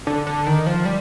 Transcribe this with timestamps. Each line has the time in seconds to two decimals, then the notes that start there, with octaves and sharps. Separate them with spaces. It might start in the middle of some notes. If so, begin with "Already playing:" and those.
0.07 D3
0.27 D3
0.47 D#3
0.66 F3
0.85 G3